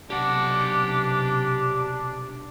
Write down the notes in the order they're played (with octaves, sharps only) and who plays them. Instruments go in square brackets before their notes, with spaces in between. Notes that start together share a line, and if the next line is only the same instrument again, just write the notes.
[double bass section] B1 C3 [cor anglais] D4 [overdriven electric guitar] G4 F#5